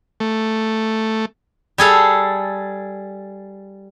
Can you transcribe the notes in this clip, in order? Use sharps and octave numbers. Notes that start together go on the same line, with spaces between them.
A3
G3 G#4 A4 F5